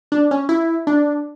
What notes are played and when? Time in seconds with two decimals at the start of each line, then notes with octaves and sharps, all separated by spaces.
0.12 D4
0.31 C#4
0.49 E4
0.87 D4